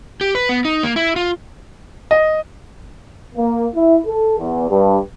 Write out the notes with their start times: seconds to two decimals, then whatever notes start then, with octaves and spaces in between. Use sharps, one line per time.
0.21 G4
0.35 B4
0.49 B3
0.65 D#4
0.83 A#3
0.96 E4
1.16 F4
2.11 D#5
3.35 A#3
3.75 E4
4.06 A4
4.39 E2
4.70 G2